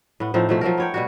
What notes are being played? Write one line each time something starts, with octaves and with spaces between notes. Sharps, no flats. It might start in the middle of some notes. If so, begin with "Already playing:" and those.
A2 B3
A2 F3 C4 D#4
B2 F3 A3
F3 F#3 A3 A#4
B3 C#5 G5
B2 G3 F#4